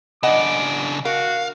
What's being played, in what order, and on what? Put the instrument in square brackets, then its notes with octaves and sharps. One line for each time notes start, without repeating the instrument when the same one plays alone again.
[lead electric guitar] C#3 D4 [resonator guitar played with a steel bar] D#5 F#5 [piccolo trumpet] D6
[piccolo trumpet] F#4 [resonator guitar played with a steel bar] A#4 [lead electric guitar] F5